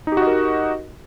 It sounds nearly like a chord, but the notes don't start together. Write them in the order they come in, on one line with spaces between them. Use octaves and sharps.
D#4 G4 F#4 D#5 A#4